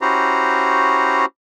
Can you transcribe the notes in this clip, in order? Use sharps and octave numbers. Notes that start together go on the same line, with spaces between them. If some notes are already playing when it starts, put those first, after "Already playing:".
C#4 E4 F#4 G4 C5 A#5